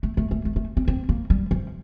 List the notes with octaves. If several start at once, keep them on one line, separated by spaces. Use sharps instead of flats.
A3
A3
A3
A3
A3
C4
C4
A#3
G3
F3